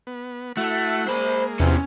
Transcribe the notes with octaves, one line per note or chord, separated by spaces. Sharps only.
B3
A3 E4 F#4 F#5
G#3 A#3 C5 B5
E2 C3 F3 C#4